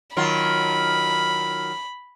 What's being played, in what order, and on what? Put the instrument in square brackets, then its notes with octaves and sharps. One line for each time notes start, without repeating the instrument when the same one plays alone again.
[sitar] D#3 F#3 F4 [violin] B5